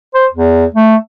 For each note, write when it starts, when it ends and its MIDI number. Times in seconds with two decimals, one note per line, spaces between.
0.14 0.26 72
0.33 0.66 40
0.75 0.96 57